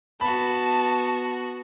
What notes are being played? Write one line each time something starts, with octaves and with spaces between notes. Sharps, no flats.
B3 F#4 A5 B5